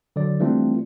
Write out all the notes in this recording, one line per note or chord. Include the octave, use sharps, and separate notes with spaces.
D3 F#3 D5
E3 G3 A3 C4 D4 F4